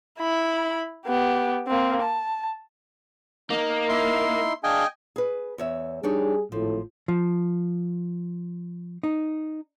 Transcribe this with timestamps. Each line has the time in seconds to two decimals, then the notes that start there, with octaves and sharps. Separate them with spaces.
0.18 E4 B5
1.06 B3 G4
1.67 A#3 C4
2.02 A5
3.50 A#3 D#4
3.89 E4 C6
4.64 D4 G#4 D#5 F5 G5 G#5
5.16 G#4 B4
5.58 E2 C#5 E5
6.03 G3 D4 D#4 G#4 C#5
6.52 G#1 A2 F3
7.08 F3
9.03 D#4